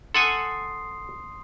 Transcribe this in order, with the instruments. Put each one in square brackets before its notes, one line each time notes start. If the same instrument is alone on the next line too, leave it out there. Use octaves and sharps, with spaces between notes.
[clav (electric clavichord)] A4 F#5 G#5 [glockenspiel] C6 D#6 C7